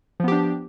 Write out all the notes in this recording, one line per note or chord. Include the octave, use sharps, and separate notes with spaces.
F3 B3 D4 G4